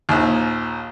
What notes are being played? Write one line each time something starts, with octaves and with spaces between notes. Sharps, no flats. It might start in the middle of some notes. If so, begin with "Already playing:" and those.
A#1 D#2